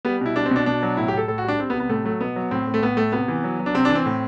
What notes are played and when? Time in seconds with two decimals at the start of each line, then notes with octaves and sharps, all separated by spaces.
0.05 G3 B3
0.21 B2 E4
0.36 G3 D4
0.46 C4
0.51 B2 D4
0.66 B2 D4
0.83 F#3
0.97 A2 E4
1.08 G4
1.13 A2 A4
1.28 A2 A4
1.38 F#4
1.44 G3 D4
1.59 G3 C4
1.70 B3
1.74 C3
1.80 B3
1.89 A2 A3
2.05 F#3 A3
2.21 B2 B3
2.36 F#3
2.51 A2 C4
2.67 A2
2.74 A3
2.82 A2 B3
2.97 A2 A3
3.12 C3 B3
3.28 E3
3.44 F#3
3.60 F#3
3.66 D4
3.75 C3 C4
3.85 E3 D4
3.95 C4
4.06 A2